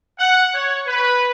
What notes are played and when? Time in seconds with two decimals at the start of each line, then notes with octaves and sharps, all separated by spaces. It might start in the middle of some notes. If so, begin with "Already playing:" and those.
0.18 F#5
0.54 C#5
0.86 B4